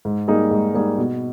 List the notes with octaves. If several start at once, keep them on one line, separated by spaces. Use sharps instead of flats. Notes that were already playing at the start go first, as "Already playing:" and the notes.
G#2
G3 A#3 D#4 G#4
G#2
G3 A#3 D#4 G#4
B2